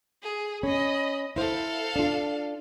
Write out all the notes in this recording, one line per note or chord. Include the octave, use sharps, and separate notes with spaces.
G#4
C#4 D#5 B5
E4 A4 C5 F5
D4 F4